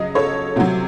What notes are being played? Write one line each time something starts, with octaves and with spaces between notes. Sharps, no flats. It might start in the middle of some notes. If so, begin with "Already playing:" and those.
Already playing: C#3 F#3 D#5
A4 C#5
C3 F#3 F#4